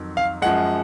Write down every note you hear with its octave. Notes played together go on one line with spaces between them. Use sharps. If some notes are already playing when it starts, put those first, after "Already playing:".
Already playing: F2 D#3 F#3
F5
F#2 F3 G#3 F#5